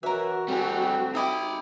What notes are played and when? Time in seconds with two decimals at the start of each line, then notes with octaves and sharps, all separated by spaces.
0.03 F#2 B2 E3 F#4 A#4 E5
0.48 D2 A2 G3 C4 G#4
1.15 D#4 G4 D#5 E5 B5